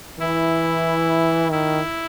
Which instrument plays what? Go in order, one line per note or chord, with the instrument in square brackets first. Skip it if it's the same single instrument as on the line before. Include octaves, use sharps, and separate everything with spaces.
[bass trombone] E3 [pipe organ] E4
[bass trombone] D#3 [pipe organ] E4